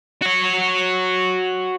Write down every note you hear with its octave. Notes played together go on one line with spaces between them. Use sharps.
F#4 C#5